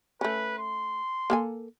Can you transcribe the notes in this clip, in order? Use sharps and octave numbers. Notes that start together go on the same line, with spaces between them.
A3 C#4 B4
C6
A#3 A4 G#5